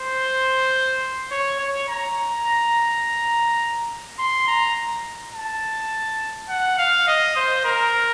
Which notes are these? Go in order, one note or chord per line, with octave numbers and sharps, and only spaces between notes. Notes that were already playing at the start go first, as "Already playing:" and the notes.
Already playing: C5
C#5
C#5
A#5
C6
A#5
A5
F#5
F5
D#5
C5
A#4